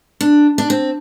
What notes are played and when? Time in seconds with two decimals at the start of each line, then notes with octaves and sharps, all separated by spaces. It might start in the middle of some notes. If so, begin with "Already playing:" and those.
0.21 D4
0.58 D4
0.70 C4